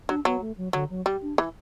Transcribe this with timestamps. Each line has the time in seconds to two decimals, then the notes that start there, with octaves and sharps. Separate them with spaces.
0.09 F#3 D4
0.25 F#3 B3
0.41 A3
0.57 F#3
0.73 D3 F#3
0.90 F#3
1.06 G3
1.22 D4
1.38 E3